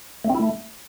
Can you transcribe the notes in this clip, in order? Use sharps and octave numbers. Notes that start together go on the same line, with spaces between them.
A3
C4
E4
A3